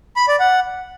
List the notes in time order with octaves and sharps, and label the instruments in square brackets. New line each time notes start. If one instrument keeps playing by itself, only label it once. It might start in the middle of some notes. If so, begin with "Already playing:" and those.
[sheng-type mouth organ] B5
D5
F#5